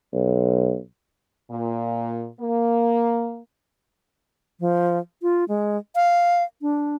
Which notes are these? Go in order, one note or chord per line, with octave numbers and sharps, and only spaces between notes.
B1
A#2
A#3
F3
F4
G#3
F5
D4